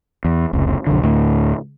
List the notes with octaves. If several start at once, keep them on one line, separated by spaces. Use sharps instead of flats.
E2
F1 C#2
B1 F2 D3
D2 A2